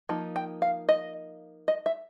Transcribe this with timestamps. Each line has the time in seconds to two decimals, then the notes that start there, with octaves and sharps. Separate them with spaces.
0.09 F3 A#3 D#4
0.36 G5
0.62 F5
0.89 D#5
1.68 D#5
1.86 E5